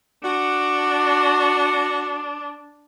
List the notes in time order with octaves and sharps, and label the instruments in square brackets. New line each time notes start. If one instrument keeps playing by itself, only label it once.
[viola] D4 [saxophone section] F#4